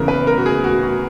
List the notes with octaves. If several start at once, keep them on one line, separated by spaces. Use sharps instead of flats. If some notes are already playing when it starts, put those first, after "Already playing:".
Already playing: E2 C#3 E3 A#4
B4
A#4
F#4
G#4
F#4
F#4